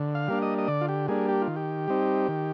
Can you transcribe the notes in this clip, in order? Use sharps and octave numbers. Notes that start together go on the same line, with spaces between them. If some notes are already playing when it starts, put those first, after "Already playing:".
Already playing: D3
F5
G3 A#3 D4
D#5
D#5
D3 D5
F4
G4
G3 A#3 D4 G#4
G4
F4
D#3
G4
G3 C4 D#4
D#3